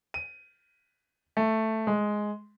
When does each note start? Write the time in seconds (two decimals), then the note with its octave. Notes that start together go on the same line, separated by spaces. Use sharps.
0.14 D#7
1.37 A3
1.87 G#3